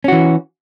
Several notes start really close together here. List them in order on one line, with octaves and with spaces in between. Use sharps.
C#4 F#4 E3